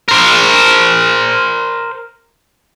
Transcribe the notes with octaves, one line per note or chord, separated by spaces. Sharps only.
A#4 C5